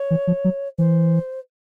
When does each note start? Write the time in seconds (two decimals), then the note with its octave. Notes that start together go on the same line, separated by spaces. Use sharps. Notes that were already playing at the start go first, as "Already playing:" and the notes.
Already playing: C#5
0.11 E3
0.27 F3
0.44 F#3
0.78 E3 C5